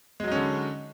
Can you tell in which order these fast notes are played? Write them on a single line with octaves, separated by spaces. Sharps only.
G#3 F#3 D#4 C#4 D3